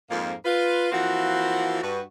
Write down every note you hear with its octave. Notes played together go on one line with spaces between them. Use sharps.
F2 G#2 A#3
F4 B4
E3 F3 A#3 C4 F#4 F#5
G2 F#4 B4